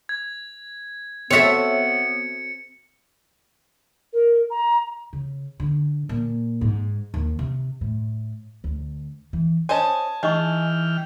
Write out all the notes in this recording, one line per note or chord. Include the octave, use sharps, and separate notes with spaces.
G#6
B3 C4 F#4 A4 C#5 E5 C#7
A#4
A#5
C#3
D3
A#2
G#2
D#2
C3
A2
D2
E3
C#4 C5 D#5 G#5 A5
E3 D#4 G#4 D#5 G5 C#6 F6